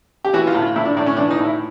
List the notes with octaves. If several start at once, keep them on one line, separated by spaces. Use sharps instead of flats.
G4
E3 F#4
F4
A2
F4
A2 E4
D4
A2 D4
C#4
E3 D4
D#4
A2
E4